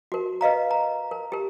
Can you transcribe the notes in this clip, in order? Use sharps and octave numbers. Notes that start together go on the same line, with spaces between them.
F#4 A#4
B4 D#5 F5 A#5
A#5
A#4
G4 A#4